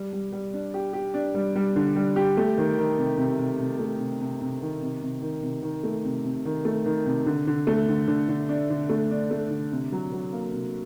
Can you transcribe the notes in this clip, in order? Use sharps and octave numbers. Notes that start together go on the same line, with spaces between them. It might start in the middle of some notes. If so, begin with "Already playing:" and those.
Already playing: G3
G3
G3
D4
G4
G4
D4
G3
G3
D3
G3
G4
A3
D#3
D#3
C3
C3
C3
C3
A3
C3
C3
C3
D#3
C3
C3
D#3
C3
D#3
A3
C3
C3
D#3
A3
D#3
C3
D3
D3
A3
D3
D3
D3
D4
D3
A3
D4
A3
D3
C3
F#3
F#3
A#3
C3